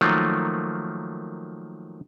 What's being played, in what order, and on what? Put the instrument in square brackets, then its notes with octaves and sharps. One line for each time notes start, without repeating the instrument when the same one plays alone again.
[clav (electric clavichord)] D#3 F3 F#3 A3 A#3